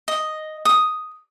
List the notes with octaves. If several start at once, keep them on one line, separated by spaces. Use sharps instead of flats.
D#5
D#6